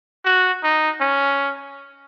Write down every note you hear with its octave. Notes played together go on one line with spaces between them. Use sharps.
F#4
D#4
C#4